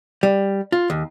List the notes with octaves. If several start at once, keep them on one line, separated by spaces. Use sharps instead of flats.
G3
F4
D#2